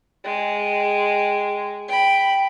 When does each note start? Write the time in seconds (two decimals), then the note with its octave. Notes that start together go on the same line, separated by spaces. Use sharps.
0.24 G#3 G5
1.88 G5 B5